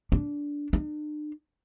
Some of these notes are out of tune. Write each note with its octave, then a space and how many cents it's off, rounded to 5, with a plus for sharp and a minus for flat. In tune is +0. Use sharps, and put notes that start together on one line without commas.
D4 -15
D4 +40